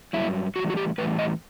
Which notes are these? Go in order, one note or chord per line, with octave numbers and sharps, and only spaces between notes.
G2 F#3 E4
A2 E3 G3 F#4
F#4
G4
A2 E3 G3 B4
D#5